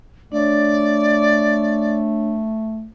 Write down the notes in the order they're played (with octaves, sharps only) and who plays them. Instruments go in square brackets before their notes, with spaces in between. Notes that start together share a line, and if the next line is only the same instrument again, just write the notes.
[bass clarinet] A3 [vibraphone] D4 C#5 [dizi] D5